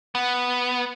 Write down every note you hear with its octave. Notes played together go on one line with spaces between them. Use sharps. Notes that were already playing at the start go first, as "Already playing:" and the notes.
B3